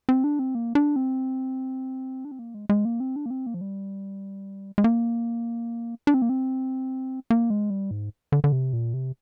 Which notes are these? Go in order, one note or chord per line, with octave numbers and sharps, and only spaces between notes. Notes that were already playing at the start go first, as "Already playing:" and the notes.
C4
D4
C4
A#3
D4
C4
D4
C4
A#3
G#3
G#3
A#3
C4
D4
A#3
C4
A#3
F3
G3
G#3
A#3
D4
C4
A#3
C4
A#3
G#3
G3
G#2
D3
D3
C3
A#2
C3